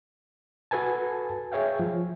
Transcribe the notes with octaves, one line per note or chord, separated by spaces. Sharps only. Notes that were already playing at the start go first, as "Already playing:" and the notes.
F#4 A4 B4 G#5 A5
G#4 C#5 E5 F5 G5
F3